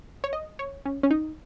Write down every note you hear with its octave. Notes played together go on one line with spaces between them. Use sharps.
C#5
D#5
C#5
C#4
C#4
D#4